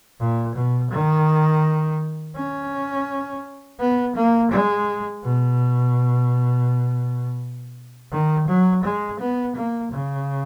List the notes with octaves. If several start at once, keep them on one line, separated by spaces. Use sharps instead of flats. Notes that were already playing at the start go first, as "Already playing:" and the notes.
A#2
B2
D#3
C#4
B3
A#3
G#3
B2
D#3
F#3
G#3
B3
A#3
C#3